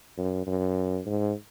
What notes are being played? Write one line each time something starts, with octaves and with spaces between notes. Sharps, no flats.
F#2
F#2
G#2